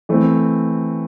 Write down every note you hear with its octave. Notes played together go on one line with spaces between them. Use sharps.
E3 A3 C4